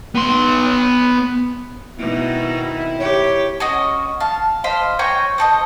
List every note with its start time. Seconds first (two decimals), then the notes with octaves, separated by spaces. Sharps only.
0.15 B3 C6
1.98 B2 D#3 C4 D#4 E4
3.00 G4 C#5
3.60 C#4 F#4 D#5
4.20 F5 A5
4.64 C5 D#5 F5 B5
4.99 C#5 G5 G#5 A#5
5.38 C4 A4 D#5